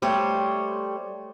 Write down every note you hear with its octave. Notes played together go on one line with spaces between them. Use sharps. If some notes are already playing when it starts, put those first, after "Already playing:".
G3 A3 C5 C#5